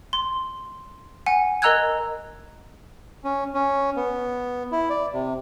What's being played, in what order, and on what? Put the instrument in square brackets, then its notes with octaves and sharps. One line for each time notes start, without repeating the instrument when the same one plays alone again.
[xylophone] C6
F#5 G#5
A#4 D#5 A#5 E6 F#6 G#6
[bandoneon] C#4
C#4
B3
E4
D5
C3